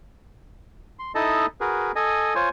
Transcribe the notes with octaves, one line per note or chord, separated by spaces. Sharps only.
C6
D#4 E4 A4 D#5 A5
F#4 G#4 A#4 B4
A4 D#5 G#5
F4 C5 C#5 G#5